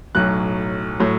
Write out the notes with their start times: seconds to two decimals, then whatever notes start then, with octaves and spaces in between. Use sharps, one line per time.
0.15 B1 A2 F#3 F#6
1.00 A2 F#3